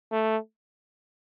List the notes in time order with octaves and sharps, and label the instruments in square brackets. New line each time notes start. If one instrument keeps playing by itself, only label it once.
[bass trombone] A3